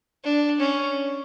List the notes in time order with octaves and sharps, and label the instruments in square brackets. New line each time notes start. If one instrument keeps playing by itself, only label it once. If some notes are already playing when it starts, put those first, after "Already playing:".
[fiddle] D4
C#4